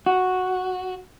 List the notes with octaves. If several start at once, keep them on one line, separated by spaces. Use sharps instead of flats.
F#4